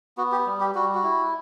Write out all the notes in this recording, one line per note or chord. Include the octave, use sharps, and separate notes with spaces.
B3 F#4
G4
G3
G4
G3 F#4
F#4
E4